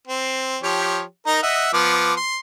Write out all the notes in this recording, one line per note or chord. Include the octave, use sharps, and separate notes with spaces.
C4
F3 G4 C#5
D#4 A#4 A#5
D#5 E5 F#5
F3 B3 D6
C6